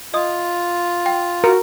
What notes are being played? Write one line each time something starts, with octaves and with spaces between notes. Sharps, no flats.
F4 D#5 D#6
G5
F#4 A#4